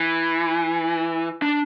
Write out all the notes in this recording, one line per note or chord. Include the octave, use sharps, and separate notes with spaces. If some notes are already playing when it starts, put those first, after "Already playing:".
Already playing: E3
D4